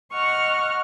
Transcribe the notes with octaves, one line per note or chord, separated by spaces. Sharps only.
D#5 F#5 C#6 F6